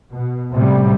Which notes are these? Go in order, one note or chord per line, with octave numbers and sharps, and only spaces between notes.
B2
A2 C3 G3